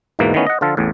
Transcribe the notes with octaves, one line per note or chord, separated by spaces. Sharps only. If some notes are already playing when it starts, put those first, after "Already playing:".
E2 G#2 B2 E3 A#3
D#3 E3 A3 B3 C#4
D#5 F#5
D3 F3 F4 A4
A1 E2 A2